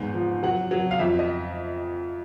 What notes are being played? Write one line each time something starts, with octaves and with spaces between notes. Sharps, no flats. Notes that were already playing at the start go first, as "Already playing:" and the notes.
Already playing: E2 G#2
F3
F#3 F#5
F#3
F5
F2 E5
D#5